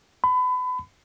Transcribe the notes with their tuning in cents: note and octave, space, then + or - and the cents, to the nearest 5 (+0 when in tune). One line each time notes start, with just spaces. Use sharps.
B5 +30